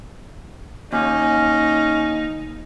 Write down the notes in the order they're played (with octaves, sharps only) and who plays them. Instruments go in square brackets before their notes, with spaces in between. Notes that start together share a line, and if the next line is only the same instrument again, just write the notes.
[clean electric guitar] D#2 [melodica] C#4 [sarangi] D#4